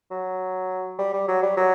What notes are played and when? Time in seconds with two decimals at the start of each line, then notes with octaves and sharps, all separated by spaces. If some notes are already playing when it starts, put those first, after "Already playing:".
0.11 F#3
0.99 G3
1.13 G3
1.28 F#3
1.43 G3
1.57 F#3